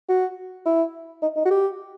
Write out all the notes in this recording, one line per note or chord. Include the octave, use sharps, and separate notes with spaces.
F#4
E4
D#4
D#4
F#4
G4